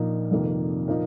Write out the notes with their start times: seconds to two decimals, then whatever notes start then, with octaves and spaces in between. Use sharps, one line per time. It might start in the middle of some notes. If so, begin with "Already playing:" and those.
Already playing: A#1 A#2 A#3 D#4
0.31 F1 F2 C3 D#3 A#3
0.88 A#2 F3 A#3 D#4